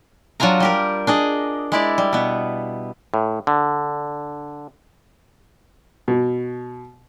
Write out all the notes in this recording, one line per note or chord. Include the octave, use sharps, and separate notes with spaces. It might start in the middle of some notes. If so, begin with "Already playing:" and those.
F#3 D4 F4 G#5 A#5
G3 G4 A#4
D4 G#4 D#5
G#3 E4 D5
G3
B2 B3
A2
D3
B2